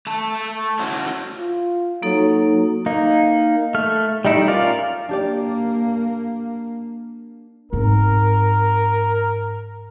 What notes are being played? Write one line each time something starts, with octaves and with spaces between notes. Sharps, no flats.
A3 A5
C#4 E4 F#4 C5
F4
F#3 A#3 D#4 A4
A#3 D#4
A3 F6
G3 A3 D#4 E4
C#4 F4 A#4 D5
A#3 D4 G4 D5
G#2 C4 A#4